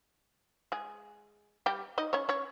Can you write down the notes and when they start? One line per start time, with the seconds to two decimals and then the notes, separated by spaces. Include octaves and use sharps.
0.72 G#3 G#4
1.66 G3 G4
1.98 D#4 D#5
2.13 C#4 C#5
2.29 C#4 C#5